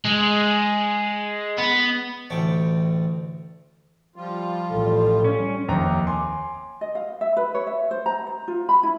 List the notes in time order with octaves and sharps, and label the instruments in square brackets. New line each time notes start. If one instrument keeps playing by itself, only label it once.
[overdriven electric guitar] G#3
B3
[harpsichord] A1 D2 D5 G5 A5 C#6
[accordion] F3 G3 F4
[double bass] A1 [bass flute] A4
[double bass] G3 [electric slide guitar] C#4
[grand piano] F1 D#2 D#3 A#5
G#5 C6 D6
[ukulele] D#5
F5
E5
B4
C#5
E5
C5
A#5
C5
F4
B5
E4